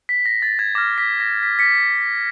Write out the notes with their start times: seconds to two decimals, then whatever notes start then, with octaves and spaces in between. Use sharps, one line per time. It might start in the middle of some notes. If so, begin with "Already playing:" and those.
0.09 B6
0.26 A#6
0.42 A6
0.59 G#6
0.75 D6 F6 A#6
0.98 B6
1.20 A#6
1.43 B6
1.59 B6 C#7